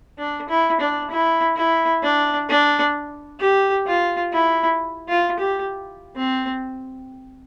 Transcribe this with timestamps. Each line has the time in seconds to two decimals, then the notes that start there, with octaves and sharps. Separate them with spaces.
0.19 D4
0.49 E4
0.81 D4
1.11 E4
1.56 E4
2.03 D4
2.49 D4
3.40 G4
3.87 F4
4.33 E4
5.09 F4
5.40 G4
6.16 C4